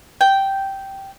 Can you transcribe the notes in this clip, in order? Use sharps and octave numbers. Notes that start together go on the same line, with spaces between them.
G5